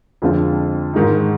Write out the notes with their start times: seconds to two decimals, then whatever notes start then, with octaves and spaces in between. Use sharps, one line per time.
0.22 F2 D3 G#3 C4 F4
0.94 G#2 D#3 G#3 D#4